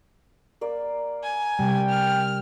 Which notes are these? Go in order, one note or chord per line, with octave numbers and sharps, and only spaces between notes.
A#3 D5
G#5
C3 G3 G5
F6